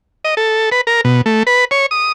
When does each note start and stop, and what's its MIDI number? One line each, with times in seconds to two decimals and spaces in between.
0.25 0.35 75
0.37 0.70 69
0.72 0.81 71
0.87 1.01 70
1.05 1.21 47
1.26 1.43 57
1.47 1.65 71
1.71 1.86 73
1.91 2.12 87